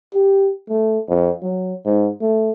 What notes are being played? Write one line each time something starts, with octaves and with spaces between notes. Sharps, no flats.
G4
A3
F2
F#3
G#2
A3